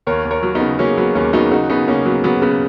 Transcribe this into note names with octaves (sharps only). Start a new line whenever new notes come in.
D#2 A#4 C#5
D#2
A#4 C#5
F#3
B3 D#4
C#3
F#3 A#3 C#4
F#3 B3
D#2 A#3 C#4
F#3 B3 D#4
C#3 D#4 F#4
C#3 B3 D#4
C#3 A#3 C#4
F#3 B3
F#3 B3
C#3 B3